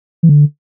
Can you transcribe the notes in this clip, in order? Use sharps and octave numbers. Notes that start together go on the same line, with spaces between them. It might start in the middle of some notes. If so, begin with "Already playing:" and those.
E3
D3